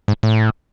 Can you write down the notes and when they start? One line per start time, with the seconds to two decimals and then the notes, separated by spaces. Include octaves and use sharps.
0.08 G#2
0.23 A2